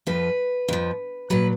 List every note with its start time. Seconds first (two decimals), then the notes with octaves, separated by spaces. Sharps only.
0.07 F2 F3 B4
0.68 F2 F3
1.30 A#2 F#3 B4